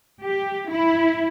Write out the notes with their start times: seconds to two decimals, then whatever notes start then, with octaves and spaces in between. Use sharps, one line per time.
0.24 G4
0.72 E4